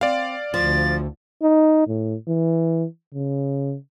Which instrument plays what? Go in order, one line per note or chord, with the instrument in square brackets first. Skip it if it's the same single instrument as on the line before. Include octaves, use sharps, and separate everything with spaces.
[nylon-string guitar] C4 [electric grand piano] D5 F5
[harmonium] D2 [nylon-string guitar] F3 [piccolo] A6
[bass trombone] D#4
A2
E3
C#3